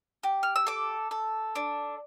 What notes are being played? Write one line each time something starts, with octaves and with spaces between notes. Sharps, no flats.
G4
F6
E6
A4 D6
A4
D4